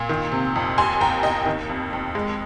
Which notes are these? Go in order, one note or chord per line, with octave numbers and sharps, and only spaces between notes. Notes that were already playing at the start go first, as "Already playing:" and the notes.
Already playing: A#2
D#3
C3
F2
D#2 G#5 C6
D#2 G5 A#5
D#2 D#5 G5
D#3
F2
F2
G#3